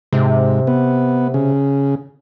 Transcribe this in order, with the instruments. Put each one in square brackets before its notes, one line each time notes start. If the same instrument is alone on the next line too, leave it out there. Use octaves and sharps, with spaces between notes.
[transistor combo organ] G#2 [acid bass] C3
[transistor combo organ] B3
C#3